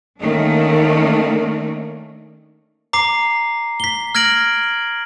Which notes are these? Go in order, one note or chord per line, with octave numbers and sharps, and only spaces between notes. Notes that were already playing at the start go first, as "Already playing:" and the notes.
D#3 A3 A#3 C#4 D4
A#5 D6 C7
B6 G7
F6 G#6 A#6 D7 F#7